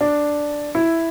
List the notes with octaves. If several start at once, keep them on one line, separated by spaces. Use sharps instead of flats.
D4
E4